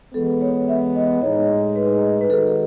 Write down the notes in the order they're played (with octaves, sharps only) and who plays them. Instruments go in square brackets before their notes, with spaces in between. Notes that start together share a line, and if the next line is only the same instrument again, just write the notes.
[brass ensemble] E3 G#3 B3 [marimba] A4
[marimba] C#5
E5
D#5
[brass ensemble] A2 G#3 D#4 G#4 [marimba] C#5
[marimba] B4
B4
[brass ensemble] D#3 G#3 D#4 F#4 [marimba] A4